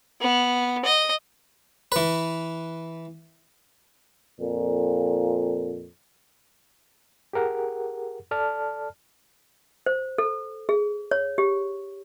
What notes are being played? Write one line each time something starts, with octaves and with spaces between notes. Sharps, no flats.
B3
D#5
E3 B4
F2 A#2
G4 G#4 A#4 F#5
A4 D5 A5 F6
C5
A4
G#4
C#5
G4